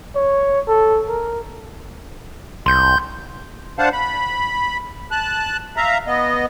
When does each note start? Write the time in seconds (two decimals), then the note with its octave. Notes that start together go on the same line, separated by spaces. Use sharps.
0.16 C#5
0.68 A4
1.09 A#4
2.66 C2 C6 G6
3.79 D4 C5 F5 F#5 A5
3.93 B5
5.11 A5 F#6
5.77 E5 F5 A#5
6.07 B3 D#5